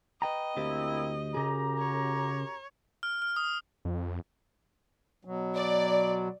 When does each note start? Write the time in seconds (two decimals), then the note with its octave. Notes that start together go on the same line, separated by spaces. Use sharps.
0.22 B4 D#5 G5 A#5
0.57 D2 A#3 C4 E4 G4 C5
1.34 F#2 C#3 G4 G#4 A#5
1.78 C#5
3.03 F6
3.22 F6
3.36 D#6
3.85 F2
5.25 B2 F#3
5.55 D5